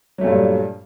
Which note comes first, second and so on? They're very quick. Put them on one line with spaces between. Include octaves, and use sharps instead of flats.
F#3 A3 A#2 G2